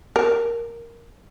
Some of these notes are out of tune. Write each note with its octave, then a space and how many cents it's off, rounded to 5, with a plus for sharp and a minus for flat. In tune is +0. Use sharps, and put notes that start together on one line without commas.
A#4 +0